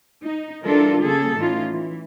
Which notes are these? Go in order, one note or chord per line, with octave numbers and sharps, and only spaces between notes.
D#4
E3 G3 D4 F4 A4 A#4
C#3 G3 A#3 G#4 A4
A2 E3 C#4 D#4 F4
E3